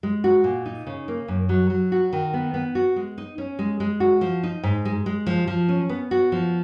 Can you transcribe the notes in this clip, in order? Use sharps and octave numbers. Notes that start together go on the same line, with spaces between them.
G#3
F#4
A#2
D#4
C#3
A#3
F#2
F#3
F#3
F#4
D#3
B3
B3
F#4
G#3
D#4
C#4
G#3
G#3
F#4
F3
D#4
G#2
G#3
G#3
F3
F3
C#4
B3
F#4
F3